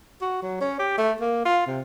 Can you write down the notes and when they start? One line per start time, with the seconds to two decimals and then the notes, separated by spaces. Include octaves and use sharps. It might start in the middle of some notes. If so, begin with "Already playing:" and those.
0.21 F#4
0.42 F#3
0.61 C#4
0.79 G4
0.98 A3
1.21 A#3
1.45 F4
1.67 C3